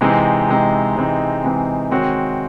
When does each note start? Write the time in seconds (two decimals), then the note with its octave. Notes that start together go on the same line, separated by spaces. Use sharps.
0.01 C3 E3 G#3 C4 D#4
0.48 C3 E3 G#3 C4 D#4
0.96 C3 E3 G#3 C4 D#4
1.43 C3 E3 G#3 C4 D#4
1.91 D#3 G#3 C4 F#4 C#5